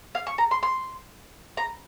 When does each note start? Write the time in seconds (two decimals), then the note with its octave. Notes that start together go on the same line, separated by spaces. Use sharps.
0.15 F5
0.27 C#6
0.38 A#5
0.51 C6
0.63 C6
1.57 A#5